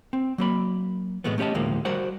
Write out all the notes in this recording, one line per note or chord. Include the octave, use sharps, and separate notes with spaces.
C4
F#3 A#3 B5
A2 E3 G#3 A3 B3
A3 C#4 G4 D#5 A5
D2 A2 F3 G#3 A#3
G3 F#4 A#4 C5 F#5